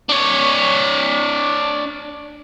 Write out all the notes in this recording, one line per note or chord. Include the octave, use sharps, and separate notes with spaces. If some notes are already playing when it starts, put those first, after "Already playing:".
D4 C#5